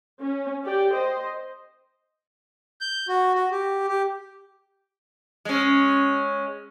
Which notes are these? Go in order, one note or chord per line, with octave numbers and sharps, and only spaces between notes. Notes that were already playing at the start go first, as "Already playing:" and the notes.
C#4
G4 D5 G5
C5 D#5
G6
F#4
F#4
G4
G4
G#3 C#4